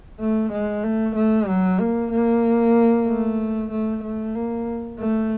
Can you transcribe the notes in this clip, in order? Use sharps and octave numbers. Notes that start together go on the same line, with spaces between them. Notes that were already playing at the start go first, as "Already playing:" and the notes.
A3
G#3
A3
A3
F#3
A#3
A#3
A3
A3
A3
A#3
A3